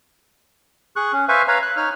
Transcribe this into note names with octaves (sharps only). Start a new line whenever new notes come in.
G#4 C#6 F#6
C#4
B4 C5 E5 F5 G#5 C#6
B4 C#5 F5 A#5 B5
F#6
D#4 C#5 F6